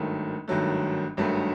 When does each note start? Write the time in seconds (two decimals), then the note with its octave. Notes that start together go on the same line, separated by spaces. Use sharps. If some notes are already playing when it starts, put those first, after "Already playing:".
Already playing: G#1 G2 D#3 F#3 A3
0.48 G#1 G2 D#3 F#3 A3
1.17 G#1 G2 D#3 F#3 A3